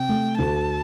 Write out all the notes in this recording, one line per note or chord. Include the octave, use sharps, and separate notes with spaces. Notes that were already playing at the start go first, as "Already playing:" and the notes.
Already playing: C3 G5
A3
D2 A5